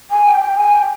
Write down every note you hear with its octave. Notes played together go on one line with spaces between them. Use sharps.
G#5
G5
G5
G#5
G5